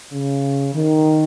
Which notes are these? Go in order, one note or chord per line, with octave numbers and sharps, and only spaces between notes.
C#3
D#3